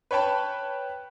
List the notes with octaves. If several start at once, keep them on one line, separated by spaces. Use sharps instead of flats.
B4 C#5 G5 A5 B5